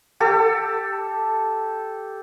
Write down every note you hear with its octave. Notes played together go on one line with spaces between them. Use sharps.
G4 A4